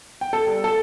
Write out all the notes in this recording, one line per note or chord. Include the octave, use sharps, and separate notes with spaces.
G5
A4
G3
A4